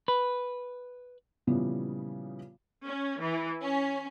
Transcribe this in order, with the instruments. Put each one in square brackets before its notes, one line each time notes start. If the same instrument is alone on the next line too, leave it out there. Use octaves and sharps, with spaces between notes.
[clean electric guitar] B4
[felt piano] A#2 C#3 E3 F3 G3 B3
[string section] C#4
E3
C#4